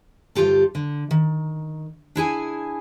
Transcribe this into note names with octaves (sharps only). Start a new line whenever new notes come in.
D2 G2 D3 F4 G4 A4
D3
D#3
D4 E4 G#4 G#5